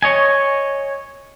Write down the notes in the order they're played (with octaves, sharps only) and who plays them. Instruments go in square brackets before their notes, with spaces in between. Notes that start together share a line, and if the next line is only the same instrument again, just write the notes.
[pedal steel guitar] C#5 D#5 G#5